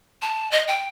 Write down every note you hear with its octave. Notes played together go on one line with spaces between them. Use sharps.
A5
D#5
G5